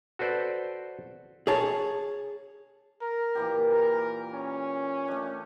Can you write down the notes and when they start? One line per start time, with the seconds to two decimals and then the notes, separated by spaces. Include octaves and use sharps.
0.19 F#4 A4 B4 C5 D5
1.47 G#4 C#5 A5
3.02 A#4
3.35 A#2 E3 G4
3.73 A#4
4.33 C#4
5.08 A3 D4